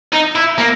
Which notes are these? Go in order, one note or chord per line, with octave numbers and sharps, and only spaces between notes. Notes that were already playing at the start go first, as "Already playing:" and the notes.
D#4
E4
A#3